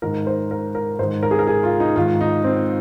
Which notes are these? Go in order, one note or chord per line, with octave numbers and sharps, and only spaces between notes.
G#2 D#3 A#4
C5
A#4
A#4
G#2 D#3 C5
A#4
G#4
A#4
G#4
F4
D#4
G#2 D#3 F4
D#4
C4